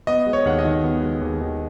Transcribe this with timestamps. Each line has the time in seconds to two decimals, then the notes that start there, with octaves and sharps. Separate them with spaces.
0.07 B3 D#5
0.26 G#3
0.33 C#5
0.45 D#2 F#5
0.59 D#5
0.65 D#3
0.84 B3
1.02 G#3
1.21 D#2
1.41 D#3